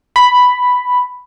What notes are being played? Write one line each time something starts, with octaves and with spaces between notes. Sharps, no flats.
B5